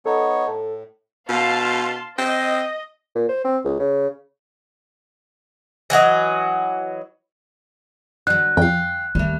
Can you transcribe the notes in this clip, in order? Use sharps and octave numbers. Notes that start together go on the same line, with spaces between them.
B3 D#4 A4 C#5
A2 A4
B2 F5 A5 C6
C4 D#5
A#2
C5
C4
C#2
C#3
E3 F#3 F#4 D#5
D3 F#3 F#6
F2 F5 G5
D#2 G3 A3